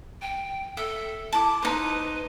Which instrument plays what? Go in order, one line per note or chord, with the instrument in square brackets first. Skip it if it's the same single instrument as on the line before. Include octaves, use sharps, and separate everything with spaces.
[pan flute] G5
[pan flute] A4 [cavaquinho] E5
[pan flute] E4 [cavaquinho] A5 D6
[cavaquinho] D#4 C5 [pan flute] B4